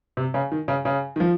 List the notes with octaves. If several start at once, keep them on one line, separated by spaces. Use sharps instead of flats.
C3
C#3
D#3
C#3
C#3
D#3
F3